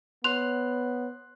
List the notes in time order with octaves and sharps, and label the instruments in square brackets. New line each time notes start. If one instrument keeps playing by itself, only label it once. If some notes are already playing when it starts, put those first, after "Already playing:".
[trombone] B3 [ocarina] C#5 [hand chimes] C6 F#6 [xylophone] F7